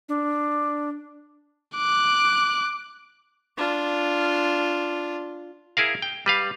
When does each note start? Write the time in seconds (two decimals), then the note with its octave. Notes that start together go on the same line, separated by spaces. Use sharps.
0.09 D4
1.76 D6 F#6
3.58 D4 F4
5.77 E4 G#4 A#4 F5
6.02 G5
6.26 G3 B4 F5